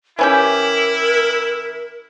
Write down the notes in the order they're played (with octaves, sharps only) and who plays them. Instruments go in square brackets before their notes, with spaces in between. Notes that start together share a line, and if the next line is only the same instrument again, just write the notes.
[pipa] E3 C#4 G4 [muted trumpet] E4 [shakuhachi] A#4